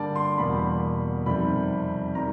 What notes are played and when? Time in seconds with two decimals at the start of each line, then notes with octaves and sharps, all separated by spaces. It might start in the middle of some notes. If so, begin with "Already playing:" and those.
Already playing: G2 D3 G3 A#3 D5 A5
0.16 C6
0.38 E2 B2 G3 A#3 B5
1.26 F2 C3 D#3 G3 B5
2.15 D#3 G3 A#5